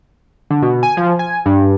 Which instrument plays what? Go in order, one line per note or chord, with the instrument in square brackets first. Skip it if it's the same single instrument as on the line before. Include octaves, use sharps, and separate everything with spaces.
[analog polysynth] D3
B2
G#5
F3
G#5
G2